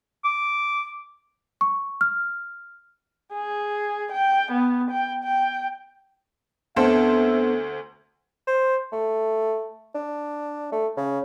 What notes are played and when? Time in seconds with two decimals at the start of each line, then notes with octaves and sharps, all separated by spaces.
0.25 D6
1.61 C#6
2.01 F6
3.34 G#4
4.12 G5
4.51 B3
4.91 G5
5.24 G5
6.76 D2 B3 C4 D4 A4 C5 E5
8.47 C5
8.92 A3
9.95 D4
10.72 A3
10.97 C#3